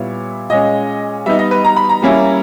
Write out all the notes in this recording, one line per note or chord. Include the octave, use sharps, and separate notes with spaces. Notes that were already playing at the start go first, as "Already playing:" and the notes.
Already playing: A#2 G3 B3 E4 C#5
A#2 G#3 C#4 D#5
G3 B3 D#4 E5
D#5
B4
A#5
B5
A#5
G3 A#3 C#4 E4